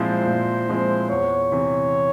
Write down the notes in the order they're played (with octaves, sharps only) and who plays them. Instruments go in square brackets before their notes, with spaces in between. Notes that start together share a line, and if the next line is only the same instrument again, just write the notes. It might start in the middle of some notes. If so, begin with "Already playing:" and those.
Already playing: [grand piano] A#2 F3 G#3 C4 E4 [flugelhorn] C5
[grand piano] A#2
F3 G#3 C4 E4
[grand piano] E2 [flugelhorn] C#5
[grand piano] C3 E3